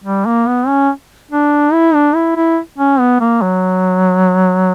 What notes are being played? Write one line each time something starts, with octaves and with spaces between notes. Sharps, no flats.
G3
A#3
B3
C#4
D4
E4
D4
E4
E4
C#4
B3
A#3
F#3